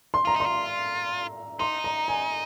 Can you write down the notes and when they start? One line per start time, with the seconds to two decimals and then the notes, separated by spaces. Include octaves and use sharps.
0.14 C6
0.25 F4 A#5
0.36 D#4 C6
0.46 F4
1.59 D#4 C6
1.84 A#5
2.08 G#5